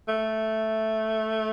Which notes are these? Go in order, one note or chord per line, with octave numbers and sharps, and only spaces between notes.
A3